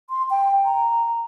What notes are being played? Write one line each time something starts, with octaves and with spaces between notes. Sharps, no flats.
C6
G5
A#5